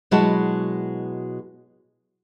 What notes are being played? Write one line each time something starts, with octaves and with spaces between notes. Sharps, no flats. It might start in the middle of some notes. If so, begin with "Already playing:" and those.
B2 F#3 G#3 E4 F#4 A5